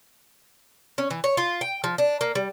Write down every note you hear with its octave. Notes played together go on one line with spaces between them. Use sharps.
C#4
E3
C#5
F4
G5
F3
D4
A#3
G3